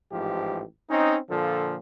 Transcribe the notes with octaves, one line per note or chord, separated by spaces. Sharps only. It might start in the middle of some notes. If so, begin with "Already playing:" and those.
A1 G#2 F3 G4
C4 C#4 D#4
A#2 D3 F3 A4